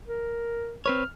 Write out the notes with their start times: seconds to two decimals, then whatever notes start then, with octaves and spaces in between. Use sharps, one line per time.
0.08 A#4
0.86 C4 B4 C#5 F6